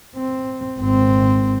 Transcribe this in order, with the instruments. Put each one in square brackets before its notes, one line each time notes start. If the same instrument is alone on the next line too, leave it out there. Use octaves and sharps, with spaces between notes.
[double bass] C4
G#1 C4